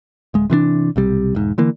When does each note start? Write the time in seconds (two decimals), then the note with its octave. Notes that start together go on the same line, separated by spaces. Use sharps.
0.34 D1 G#3
0.50 C3 E3 A3 D4
0.96 B1 C3 G3
1.35 E1 G#2
1.58 D3 E3 A#3